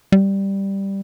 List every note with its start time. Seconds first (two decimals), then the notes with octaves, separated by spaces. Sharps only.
0.12 G3